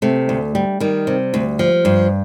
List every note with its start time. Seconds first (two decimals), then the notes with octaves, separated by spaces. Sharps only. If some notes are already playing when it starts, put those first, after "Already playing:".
0.02 C3 A3
0.29 D2
0.55 G3
0.80 D#3 G3
1.07 C3
1.34 D2
1.59 F3
1.85 G2